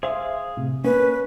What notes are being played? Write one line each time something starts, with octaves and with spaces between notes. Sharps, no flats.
G#4 C5 E5 F5 D#6
A2 C3
A#3 C#4 B4